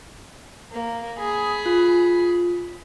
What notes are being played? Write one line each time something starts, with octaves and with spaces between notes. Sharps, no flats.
A#3
G#4 B5
F4